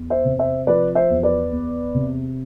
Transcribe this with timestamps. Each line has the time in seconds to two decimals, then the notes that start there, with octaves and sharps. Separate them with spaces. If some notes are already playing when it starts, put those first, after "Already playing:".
Already playing: E2
0.10 C5 E5
0.25 C3
0.39 C5 E5
0.67 F3 B4 D5
0.95 C5 E5
1.10 E2
1.23 B4 D5
1.52 E2
1.95 C3